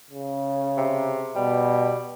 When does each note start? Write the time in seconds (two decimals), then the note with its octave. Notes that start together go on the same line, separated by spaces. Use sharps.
0.11 C#3
0.77 C3
1.36 B2 G3